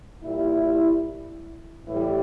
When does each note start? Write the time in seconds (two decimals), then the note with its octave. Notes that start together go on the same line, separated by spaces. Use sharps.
0.24 A#2 G3 E4
1.85 A2 E3 G3